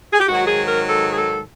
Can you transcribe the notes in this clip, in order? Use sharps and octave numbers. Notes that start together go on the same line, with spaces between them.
G#4
G4
G#2 D#3 F#3 F#4
G#4
A#4
A4
G#4
A4